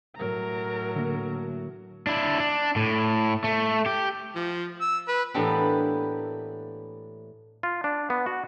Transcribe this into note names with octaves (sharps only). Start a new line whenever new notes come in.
A2 F#3 A#4 A#5
D3 A#3
D4 E4
D4
A2
A3
G4
F3
E6
B4
A2 E3 A#3 B3 D4 G4
F4
D4
B3
F#4